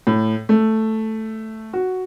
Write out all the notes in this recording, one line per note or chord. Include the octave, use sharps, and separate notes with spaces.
A2
A3
F#4